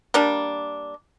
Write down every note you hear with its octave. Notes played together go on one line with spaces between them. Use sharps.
G3 A#3 D4